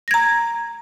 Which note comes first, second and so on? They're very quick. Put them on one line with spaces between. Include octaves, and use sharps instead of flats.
A#6 G#6 A#5